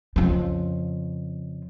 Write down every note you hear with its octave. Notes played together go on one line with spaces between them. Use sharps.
F2 C#3